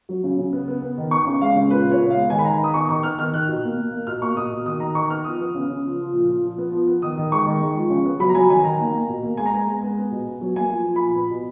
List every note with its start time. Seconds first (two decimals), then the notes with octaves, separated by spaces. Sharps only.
0.09 F#3
0.24 C#3
0.38 C#3
0.53 B3
0.68 B3
0.82 B3
0.97 D#3
1.11 B3 C#6
1.26 C#3
1.41 G#3 F5
1.56 C#3
1.70 A#2 B4
1.86 A#2
1.91 C#5
2.00 B3
2.10 F5
2.15 G#3
2.30 D#3 G#5
2.39 B5
2.45 D#3 A#5
2.60 B3 D#6
2.74 D#3 C#6
2.89 D#3 C#6
3.03 B3 F6
3.18 D#3 F6
3.33 D#3 F#6
3.48 B2
3.63 A#3
3.78 A#3
3.92 A#3
4.07 B2 F6
4.22 A#3 C#6
4.37 B2 D#6
4.52 B2
4.66 D#3 D#6
4.80 D#3 A#5
4.95 D#3 C#6
5.10 B3 F6
5.24 F3 D#6
5.40 B3
5.54 C#3
5.70 C#3
5.84 F3
5.99 F3
6.13 A#2
6.28 A#2
6.43 F3
6.58 B3
6.72 F3
6.87 B3
7.02 D#3 D#6
7.17 D#3
7.32 G#3 C#6
7.46 D#3
7.61 G#3
7.76 F3
7.90 C#3
8.06 B3
8.19 F#3 B5
8.29 A#5
8.35 F#3 G#5
8.49 D#3 G#5
8.64 D#3 A#5
8.79 A#3
8.94 A#3
9.09 B2
9.23 A#3
9.37 G#3 G#5
9.46 A#5
9.53 B3 G#5
9.68 G#3
9.83 B3
9.98 B3
10.11 B2
10.27 B3
10.41 F#3
10.56 A#3 G#5
10.70 F3
10.85 F3
10.96 A#2 B5
11.16 B3
11.30 B2